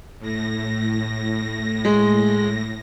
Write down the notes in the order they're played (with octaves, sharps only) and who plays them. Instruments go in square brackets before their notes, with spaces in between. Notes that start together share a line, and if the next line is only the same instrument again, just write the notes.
[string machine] A2 A#6
[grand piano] G#3